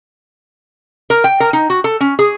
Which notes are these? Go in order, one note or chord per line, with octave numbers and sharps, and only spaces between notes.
A#4
G5
A#4
D#4
F#4
A4
C#4
G#4